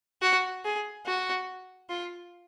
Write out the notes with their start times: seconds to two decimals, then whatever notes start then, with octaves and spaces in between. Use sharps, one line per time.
0.22 F#4
0.65 G#4
1.06 F#4
1.90 F4